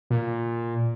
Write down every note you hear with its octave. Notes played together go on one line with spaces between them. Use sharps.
A#2